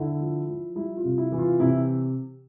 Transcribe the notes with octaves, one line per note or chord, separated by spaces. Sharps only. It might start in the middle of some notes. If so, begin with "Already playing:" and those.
Already playing: D3 E4
F3
F3
G3 E4
F4
C3
E4
E3
F4
C3 E4